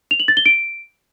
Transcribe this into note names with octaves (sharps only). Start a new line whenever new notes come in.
F7
F#7
A6
G7
D7